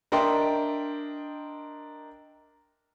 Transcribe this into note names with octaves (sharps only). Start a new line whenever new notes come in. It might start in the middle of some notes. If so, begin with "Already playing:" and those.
D4 A#4 D#5 E5 G5 C6